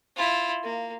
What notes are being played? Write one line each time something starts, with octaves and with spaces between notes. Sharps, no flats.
E4 F4
A#3